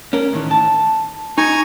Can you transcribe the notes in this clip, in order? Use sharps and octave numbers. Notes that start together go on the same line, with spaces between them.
C#4 A#4
A2 D#3 E3
A5
D#4 G#5 A#5 C#6